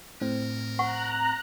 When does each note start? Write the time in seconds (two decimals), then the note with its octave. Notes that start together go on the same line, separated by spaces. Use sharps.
0.21 A2 C4 A#4
0.79 F#5 A#5 C#6 F#6